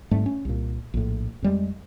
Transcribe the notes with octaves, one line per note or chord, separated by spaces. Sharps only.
G#2 G3 A3 C4
C#4
C2 A#2
A#1 A2
F2 G3 G#3